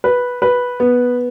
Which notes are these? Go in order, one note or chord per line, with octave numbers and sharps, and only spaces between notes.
B4
B4
B3